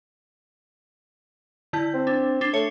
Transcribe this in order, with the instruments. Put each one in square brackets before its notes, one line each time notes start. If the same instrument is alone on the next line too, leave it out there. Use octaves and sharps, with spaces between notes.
[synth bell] D3 E4 G6
[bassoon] C4
[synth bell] D4
D4 C7 G7
[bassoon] A3 [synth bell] C#5